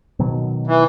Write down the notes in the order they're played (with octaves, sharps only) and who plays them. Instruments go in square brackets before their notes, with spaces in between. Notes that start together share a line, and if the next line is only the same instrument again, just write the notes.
[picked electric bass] B2 D#3 F#3
[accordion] E3